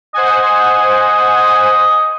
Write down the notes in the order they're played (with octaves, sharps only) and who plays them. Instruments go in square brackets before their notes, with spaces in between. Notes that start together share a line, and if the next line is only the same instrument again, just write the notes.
[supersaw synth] C5 F#5 G#5 [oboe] D#5